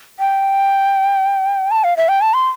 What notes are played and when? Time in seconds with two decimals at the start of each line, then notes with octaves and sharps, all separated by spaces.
0.20 G5
1.71 A5
1.84 F5
1.97 E5
2.09 G5
2.21 A5
2.34 C6